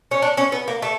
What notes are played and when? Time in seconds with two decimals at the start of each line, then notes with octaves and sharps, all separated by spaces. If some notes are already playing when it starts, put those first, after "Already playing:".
0.11 C#4
0.22 D4
0.37 C#4
0.52 B3
0.68 A#3
0.82 A3